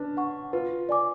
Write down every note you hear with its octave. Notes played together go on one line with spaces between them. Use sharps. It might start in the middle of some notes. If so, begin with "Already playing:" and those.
Already playing: C#4 D4 B4
F#5 C#6
F4 B4
D5 G#5 D6